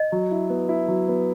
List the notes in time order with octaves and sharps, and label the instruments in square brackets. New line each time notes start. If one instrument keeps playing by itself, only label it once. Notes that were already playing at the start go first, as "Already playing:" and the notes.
Already playing: [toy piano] D#5
[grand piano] F#3
E4
B3
E4
F#3
B3